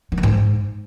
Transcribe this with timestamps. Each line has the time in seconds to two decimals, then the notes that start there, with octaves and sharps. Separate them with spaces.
0.12 D#3
0.18 E3
0.23 G#2